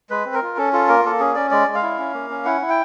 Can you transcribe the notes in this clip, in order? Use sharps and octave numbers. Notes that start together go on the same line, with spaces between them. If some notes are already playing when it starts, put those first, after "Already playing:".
G#3 B4
C4
A#4
F4
C#4 A4
F4 A4
A#3 A#4
A#3 A4
C#4 G#4
C#4 D5
G#3 D5
G#3
F5
E4
C#4
A#3
C#4
E4 F#5
E4
G5